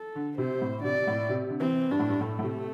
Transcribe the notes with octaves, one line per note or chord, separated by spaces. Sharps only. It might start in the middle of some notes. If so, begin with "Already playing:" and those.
Already playing: A4
D3
C3 C5
A2
D3
C3 D5
A2
C3
D3
E3 C4
G2 D4
A2
G2
A2 A3
A2
C3